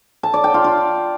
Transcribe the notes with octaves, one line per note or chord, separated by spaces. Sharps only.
A5
D5
G5
F4
F4